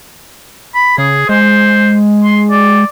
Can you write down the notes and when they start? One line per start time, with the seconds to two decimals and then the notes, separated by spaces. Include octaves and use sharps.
0.75 B5
0.98 C#3 G#4
1.29 G#3 C5
2.23 C6
2.51 D5